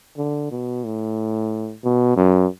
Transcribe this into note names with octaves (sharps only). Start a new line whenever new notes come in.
D3
B2
A2
B2
F#2